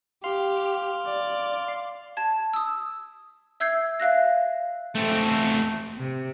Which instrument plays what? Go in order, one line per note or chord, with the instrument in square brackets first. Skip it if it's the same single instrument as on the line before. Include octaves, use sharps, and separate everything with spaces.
[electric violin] G4 [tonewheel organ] F5 C6
[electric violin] D5
[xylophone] A5 G#6
D#6 E6
E5 E6 G6 G#6 C7
E5 F5 F#6 A#6
[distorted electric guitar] A3 C4
[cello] C3